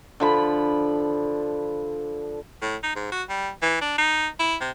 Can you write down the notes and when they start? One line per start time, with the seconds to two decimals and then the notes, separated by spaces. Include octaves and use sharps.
0.20 D3 F3 B5
2.62 A2
2.83 D#4
2.95 G#2
3.12 F#4
3.29 G3
3.62 E3
3.81 D4
3.98 D#4
4.39 E4
4.60 C3